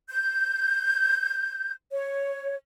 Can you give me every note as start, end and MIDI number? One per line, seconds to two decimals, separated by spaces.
0.10 1.72 91
1.91 2.55 73